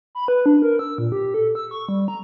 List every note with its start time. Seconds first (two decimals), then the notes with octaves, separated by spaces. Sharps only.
0.15 B5
0.28 B4
0.46 D4
0.62 A#4
0.79 E6
0.98 A#2
1.12 G4
1.34 A4
1.55 E6
1.71 C#6
1.89 G3
2.08 A#5